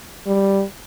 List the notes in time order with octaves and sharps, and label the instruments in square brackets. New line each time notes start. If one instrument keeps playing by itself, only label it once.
[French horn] G3